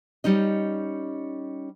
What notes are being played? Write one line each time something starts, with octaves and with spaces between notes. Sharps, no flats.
G3 C#4 D#4 D#5